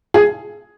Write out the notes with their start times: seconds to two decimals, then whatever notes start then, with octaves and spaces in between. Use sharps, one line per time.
0.14 G#4